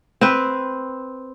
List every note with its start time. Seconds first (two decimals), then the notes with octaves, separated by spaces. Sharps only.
0.21 C4 B4